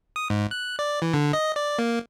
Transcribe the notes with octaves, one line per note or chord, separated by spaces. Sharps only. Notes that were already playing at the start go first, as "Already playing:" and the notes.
D#6
G#2
F#6
D5
E3
D3
D#5
D5
A#3